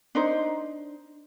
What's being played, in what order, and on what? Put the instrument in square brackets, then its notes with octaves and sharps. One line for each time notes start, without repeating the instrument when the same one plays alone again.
[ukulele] D4 D#4 C5